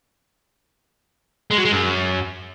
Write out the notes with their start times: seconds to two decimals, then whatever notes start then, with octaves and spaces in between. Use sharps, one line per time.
1.51 G#3
1.58 F#3
1.65 G#3
1.72 F#2